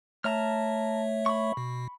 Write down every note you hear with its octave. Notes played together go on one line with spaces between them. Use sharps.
A3 C#5 E5 A5 A#5 F6
B5 C#6
B2